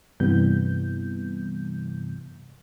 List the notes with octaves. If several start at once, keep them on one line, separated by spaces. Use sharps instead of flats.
G2 C3 E3 G3 B3 G6